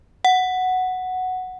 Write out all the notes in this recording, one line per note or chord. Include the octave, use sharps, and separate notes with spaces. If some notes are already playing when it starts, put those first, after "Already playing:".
F#5